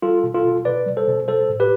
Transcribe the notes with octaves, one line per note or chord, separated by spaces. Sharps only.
G3 F4 A4
B2
F4 A4
B2
B2 B4 D5
G3
A4 C5
B2
G3 A4 C5
A2
G4 B4